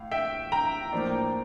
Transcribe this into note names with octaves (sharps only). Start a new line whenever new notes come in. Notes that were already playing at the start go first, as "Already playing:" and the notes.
Already playing: A2 F5
E5 G5
G5 A#5
A2 F3 A#3 D4